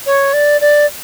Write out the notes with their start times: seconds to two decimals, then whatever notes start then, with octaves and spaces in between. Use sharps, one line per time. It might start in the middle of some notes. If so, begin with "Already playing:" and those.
0.06 C#5
0.33 D5
0.61 D5